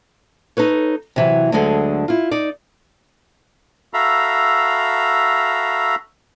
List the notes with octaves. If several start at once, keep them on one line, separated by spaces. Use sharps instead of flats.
D#4 A4 B4 C#5
C3 E3 F#3
D2 D3 F#3 G#3 G#4 A4
E4 F4
D#4 D5
F#4 A4 E5 F5 A#5 B5